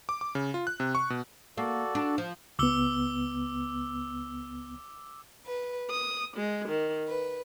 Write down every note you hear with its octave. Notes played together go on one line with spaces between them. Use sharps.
D6
D6
C#3
F4
F#6
C3
C#6
B2
A#3 F#4 A4 D5
D4
F3
C#2 B3 D6 E6 G7
B4
D#6
G#3
D#3
B4